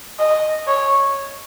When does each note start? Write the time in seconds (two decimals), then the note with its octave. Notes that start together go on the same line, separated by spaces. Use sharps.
0.19 D#5
0.67 C#5